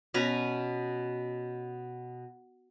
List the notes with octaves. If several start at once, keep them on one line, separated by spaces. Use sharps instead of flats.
B2 C#4 B4 A#5